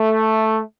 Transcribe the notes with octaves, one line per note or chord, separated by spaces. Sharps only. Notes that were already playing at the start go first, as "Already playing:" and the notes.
Already playing: A3